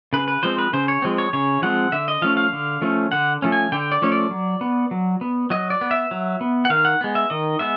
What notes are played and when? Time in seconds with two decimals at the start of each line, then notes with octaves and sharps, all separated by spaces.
0.13 C#3 B4
0.28 B4
0.43 F3 G#3 C4 C5
0.58 B4
0.73 C#3 C5
0.88 C#5
1.02 F3 G#3 C4
1.18 C#5
1.33 C#3 C#5
1.62 F3 G#3 C4 F#5
1.92 D3 E5
2.08 D#5
2.22 F3 A3 C#4 F5
2.37 F5
2.53 D3
2.82 F3 A3 C#4
3.12 D3 F#5
3.42 F3 A3 C#4
3.52 G#5
3.72 D3 G5
3.92 D5
4.02 F3 A3 C#4 C#5
4.12 D5
4.31 F#3
4.61 B3
4.91 F#3
5.21 B3
5.50 F#3 D#5
5.70 D5
5.81 B3
5.91 E5
6.11 F#3
6.41 B3
6.65 F#5
6.70 D#3 F5
6.85 F#5
7.01 G#3 B3
7.15 E5
7.30 D#3 D#5
7.59 G#3 B3 E5